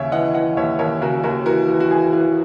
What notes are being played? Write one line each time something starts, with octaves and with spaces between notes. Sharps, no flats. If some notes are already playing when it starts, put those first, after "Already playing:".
Already playing: D#2 C#3 C#5 E5
E3 D#5 F#5
E3 D#5 F#5
D#2 C#5 E5
D#2 A#4 C#5
C#3 F#4 A#4
D#2 F#4 A#4
E3 F#4 A#4
E3
F#4
E3 G#4
E3